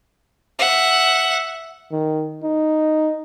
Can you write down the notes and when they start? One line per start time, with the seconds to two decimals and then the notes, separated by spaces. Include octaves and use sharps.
0.59 E5 F#5
1.92 D#3
2.43 D#4